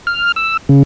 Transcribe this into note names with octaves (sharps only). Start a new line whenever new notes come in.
F6
E6
C#3